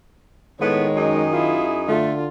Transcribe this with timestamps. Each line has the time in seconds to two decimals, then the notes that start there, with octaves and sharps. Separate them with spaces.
0.61 A2 D#3 G#3 B3 C#5
0.96 F#2 D#4 G#4
1.33 E4 F4
1.89 D3 A3 F4